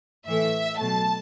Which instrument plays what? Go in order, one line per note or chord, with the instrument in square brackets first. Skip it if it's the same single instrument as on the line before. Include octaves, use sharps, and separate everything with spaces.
[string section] A2 E3 A3 E5
B2 F#3 A3 A5